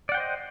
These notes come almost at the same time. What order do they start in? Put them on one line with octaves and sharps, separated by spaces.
D5 F#5 G5 C5 D#5